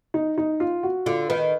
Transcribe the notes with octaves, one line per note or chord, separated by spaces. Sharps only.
D#4
D#4
F4
F#4
D3 F4
D#3 B4